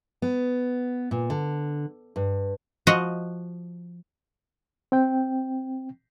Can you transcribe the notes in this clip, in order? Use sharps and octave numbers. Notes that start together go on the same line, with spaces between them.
B3
A#2
D3
G2
F3 F#4 D#5
C4 G5